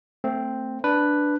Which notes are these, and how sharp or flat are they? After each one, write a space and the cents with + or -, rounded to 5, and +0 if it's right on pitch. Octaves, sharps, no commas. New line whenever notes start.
A3 +30 C4 +0
D4 +0 B4 +0